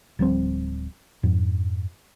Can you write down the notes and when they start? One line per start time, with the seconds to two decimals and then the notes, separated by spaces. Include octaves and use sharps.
0.19 D1 F3 G3 C4
1.23 F2 G#2